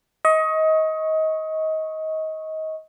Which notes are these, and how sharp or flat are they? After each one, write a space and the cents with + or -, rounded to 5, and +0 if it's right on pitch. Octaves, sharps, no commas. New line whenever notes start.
D#5 +25 C#6 -10